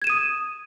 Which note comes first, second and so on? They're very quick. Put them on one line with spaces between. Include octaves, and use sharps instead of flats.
G#6 E7 D#7 D#6